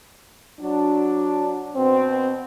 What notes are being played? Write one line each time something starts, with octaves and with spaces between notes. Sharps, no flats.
F#3 D4
B2 C4